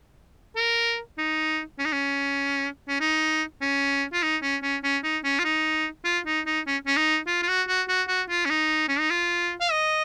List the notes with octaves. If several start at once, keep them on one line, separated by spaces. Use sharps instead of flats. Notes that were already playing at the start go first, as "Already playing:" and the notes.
A#4
D#4
C#4
D#4
C#4
C#4
D#4
C#4
F4
D#4
C#4
C#4
C#4
D#4
C#4
F4
D#4
F4
D#4
D#4
C#4
C#4
D#4
F4
F4
F#4
F#4
F#4
F#4
F4
C#4
D#4
C#4
D#4
F4
F5
D#5